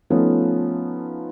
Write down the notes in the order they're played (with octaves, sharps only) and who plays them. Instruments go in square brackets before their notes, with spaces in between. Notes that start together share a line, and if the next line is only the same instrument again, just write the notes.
[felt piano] F3 A3 B3 C#4 D#4 F4